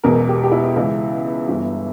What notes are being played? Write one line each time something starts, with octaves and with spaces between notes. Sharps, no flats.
E1 E2 B2 A#4
G4
G4
E4
C#2 C#3 E3 E4
G1 G2 E3